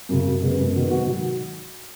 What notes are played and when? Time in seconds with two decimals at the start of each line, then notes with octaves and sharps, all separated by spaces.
0.09 F#2 C#3
0.25 F#2
0.42 C#3 G#3 B3
0.59 F#2
0.75 D#3 F#3 B3
0.91 G#2 F#4
1.07 D#3 F#3